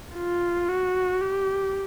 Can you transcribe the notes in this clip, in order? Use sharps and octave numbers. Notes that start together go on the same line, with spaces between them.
F4
F#4
G4